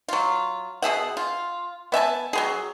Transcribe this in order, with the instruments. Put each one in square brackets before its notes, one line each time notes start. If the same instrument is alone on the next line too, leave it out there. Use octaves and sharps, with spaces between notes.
[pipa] F#3 F4
B2 G#4 E5 F#5
F4
B3 E5 G#5 A5
F#3 B3 G#4